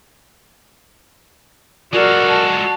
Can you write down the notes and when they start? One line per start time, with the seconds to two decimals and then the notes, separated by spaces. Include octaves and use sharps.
1.94 G#3 F#4 A4 A#4 D5
2.30 A5